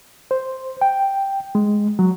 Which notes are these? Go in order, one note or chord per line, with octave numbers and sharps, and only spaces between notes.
C5
G5
G#3
F#3